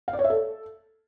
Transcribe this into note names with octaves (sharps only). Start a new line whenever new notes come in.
F5
D5
C#5
E5
A4